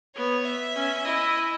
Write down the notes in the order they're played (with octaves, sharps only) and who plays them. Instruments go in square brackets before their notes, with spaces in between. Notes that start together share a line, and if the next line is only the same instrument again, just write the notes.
[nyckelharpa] B3 [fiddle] C#5
[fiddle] E5
[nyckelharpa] C#4
[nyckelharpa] E4 [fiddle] D#5